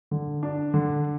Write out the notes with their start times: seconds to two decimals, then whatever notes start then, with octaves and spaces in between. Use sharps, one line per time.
0.11 D3
0.43 D4
0.74 D3